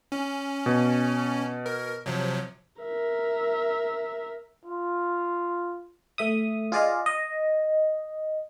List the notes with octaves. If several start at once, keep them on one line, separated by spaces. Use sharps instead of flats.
C#4
B2
A#4
C3 F3 F#3
A#4 E5
F4
A3 E5 D#6
F4 G#4 D5 D#5 F5
D#5